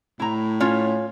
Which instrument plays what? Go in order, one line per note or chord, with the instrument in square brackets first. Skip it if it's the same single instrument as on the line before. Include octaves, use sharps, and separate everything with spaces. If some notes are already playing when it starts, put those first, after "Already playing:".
[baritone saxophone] A2 [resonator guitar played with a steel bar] E4 A#5
[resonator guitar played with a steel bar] C#4 F4 C#5